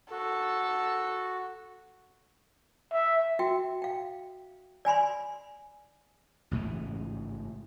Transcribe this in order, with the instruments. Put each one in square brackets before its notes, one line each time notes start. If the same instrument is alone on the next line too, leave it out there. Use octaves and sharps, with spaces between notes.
[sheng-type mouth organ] F#4 [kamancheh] A4
[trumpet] E5
[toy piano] F#4 E5 G5
F5 G5
D5 G#5 B5 C6
[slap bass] A1 G#2 C#3 E3